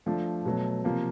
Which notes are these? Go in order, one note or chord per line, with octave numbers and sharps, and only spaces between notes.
F3 A3 D4
B2 F#3 A3
C3 F3 A#3